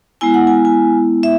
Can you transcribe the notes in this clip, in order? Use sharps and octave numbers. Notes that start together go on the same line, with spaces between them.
G#3 B3 E4 G#5
F#5
G#5
G#5
E5